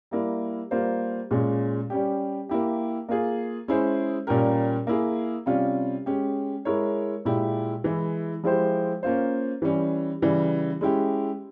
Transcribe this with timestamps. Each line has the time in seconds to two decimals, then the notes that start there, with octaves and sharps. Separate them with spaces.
0.11 G3 A#3 E4
0.71 G3 A#3 F4 C5
1.31 A#2 G#3 C#4
1.90 G3 C#4 G4
2.49 A#3 E4 G4
3.09 A#3 F4 G#4
3.68 G#3 C#4 E4 G#4 C5
4.27 A#2 G3 C#4 G4 A#4
4.87 A#3 E4 G#4
5.46 C3 G3 C#4 F4
6.06 G#3 C#4 G4
6.65 G#3 E4 A#4 C#5
7.25 A#2 G#3 E4 G4
7.84 E3 G#3 E4
8.43 F3 G#3 E4 G4 C5
9.03 A#3 C#4 F4 C5
9.62 E3 G3 C#4
10.22 C#3 E3 G3
10.81 G#3 C#4 E4 G4